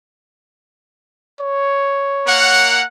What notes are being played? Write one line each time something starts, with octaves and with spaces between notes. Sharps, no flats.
C#5
A#3 A#4 F#5